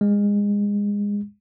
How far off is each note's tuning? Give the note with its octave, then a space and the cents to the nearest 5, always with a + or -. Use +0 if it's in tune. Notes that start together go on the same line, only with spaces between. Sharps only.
G#3 -25